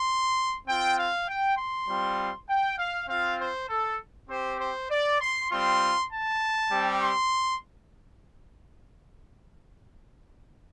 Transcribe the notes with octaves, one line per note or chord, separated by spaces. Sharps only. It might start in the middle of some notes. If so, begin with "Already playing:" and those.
Already playing: C6
C4 F4 G5
F5
G5
C6
G3 C4 F4
G5
F5
C4 F4 F5
C5
A4
C4 G4 C5
C5
D5
C6
G3 C4 F4 C6
A5
G3 C4 G4
C6